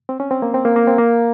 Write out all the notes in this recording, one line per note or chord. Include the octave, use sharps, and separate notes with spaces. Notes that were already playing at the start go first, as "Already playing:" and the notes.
C4
C#4
C4
A#3
C4
A#3
A#3
C4
A#3